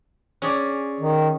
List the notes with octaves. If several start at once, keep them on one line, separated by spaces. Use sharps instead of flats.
C#4 G#4 D5
D#3